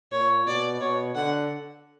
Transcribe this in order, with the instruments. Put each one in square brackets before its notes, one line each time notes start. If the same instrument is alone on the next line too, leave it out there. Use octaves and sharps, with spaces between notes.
[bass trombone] A#2 [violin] C#5
[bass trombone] B2 [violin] D5
[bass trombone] B2 [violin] C#5
[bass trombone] D3 [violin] F#5